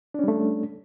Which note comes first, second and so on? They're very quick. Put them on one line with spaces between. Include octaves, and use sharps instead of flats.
D4 C#4 G3 A3